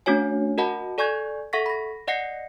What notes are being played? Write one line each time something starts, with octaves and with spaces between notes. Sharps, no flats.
A3 C#4 D4 F#4 C#5 G#5
F#4 A#4 D#5 F#5 A5 B5
A4 D5 G#5 C#6 G6 G#6
A4 E5 F#5 C#6 A#6 B6
B5 A#6
D5 D#5 F#5 A#6 C7 C#7